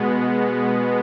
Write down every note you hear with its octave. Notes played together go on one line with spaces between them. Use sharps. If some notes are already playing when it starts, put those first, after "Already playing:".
Already playing: B2 G#3 B3